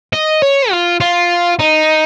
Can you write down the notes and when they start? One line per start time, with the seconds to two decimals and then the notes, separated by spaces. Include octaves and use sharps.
0.13 D#5
0.42 C#5
0.71 F4
1.01 F4
1.59 D#4